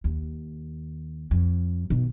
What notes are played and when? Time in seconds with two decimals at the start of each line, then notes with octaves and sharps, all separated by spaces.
0.04 D#2
1.31 F2
1.90 B2 D#3